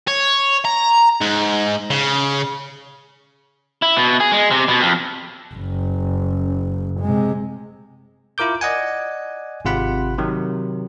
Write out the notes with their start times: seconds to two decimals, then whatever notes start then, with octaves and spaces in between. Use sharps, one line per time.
0.08 C#5
0.65 A#5
1.21 G#2
1.91 C#3
3.82 E4
3.97 B2
4.20 G#4
4.32 G#3
4.51 C3
4.68 B2
4.81 F2
5.54 F#1
7.01 C3 G#3
8.38 E4 F4 A#4 D6 G6
8.61 D5 D#5 F#5 G#5
9.65 G#1 C3 F4 F#5 B5
10.18 C3 D#3 F#3